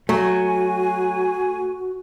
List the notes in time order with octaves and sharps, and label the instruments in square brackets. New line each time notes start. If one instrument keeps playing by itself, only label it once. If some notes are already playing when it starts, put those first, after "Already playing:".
[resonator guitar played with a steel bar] F#3 [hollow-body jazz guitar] A3 [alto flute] F#4 [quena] G#5